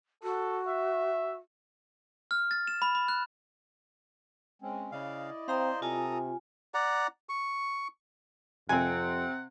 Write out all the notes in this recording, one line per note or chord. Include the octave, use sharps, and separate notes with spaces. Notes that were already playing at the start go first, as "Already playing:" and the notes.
F#4 A4
E5
F6
A6
E7
B5
B5
F#6
G#3 C4 C#4
C#3 E4 D5 D#5 F5
C4 C5 F5 A#5 C6 D#6
C3 F4 A4 G#5 A#5 D#6
D5 F#5 A#5
C#6
F2 C3 C4 F#5 G#5